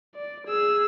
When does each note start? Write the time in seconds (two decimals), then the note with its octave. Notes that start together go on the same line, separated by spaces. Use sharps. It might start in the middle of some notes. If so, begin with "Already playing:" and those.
0.15 D5
0.47 G#4 E6